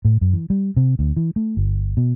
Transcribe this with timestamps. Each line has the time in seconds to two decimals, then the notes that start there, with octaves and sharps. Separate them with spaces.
0.05 A2
0.21 F#2
0.33 E3
0.50 G3
0.77 C3
0.99 D2
1.17 E3
1.36 A3
1.57 G1
1.97 B2